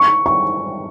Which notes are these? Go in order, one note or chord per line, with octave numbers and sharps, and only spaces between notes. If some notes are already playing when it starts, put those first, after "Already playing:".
Already playing: C#6
C#6